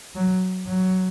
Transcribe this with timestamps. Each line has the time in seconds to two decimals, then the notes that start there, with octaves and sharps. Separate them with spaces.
0.15 F#3
0.68 F#3